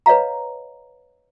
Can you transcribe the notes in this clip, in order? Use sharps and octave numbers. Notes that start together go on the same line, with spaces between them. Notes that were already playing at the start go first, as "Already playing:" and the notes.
B4 C#5 D#5 F5 A#5